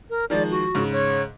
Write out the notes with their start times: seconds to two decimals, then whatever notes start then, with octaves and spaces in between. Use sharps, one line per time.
0.10 A#4
0.30 D#3 F3 G#3 D5
0.51 F#4
0.75 G#2 C#3
0.92 C#5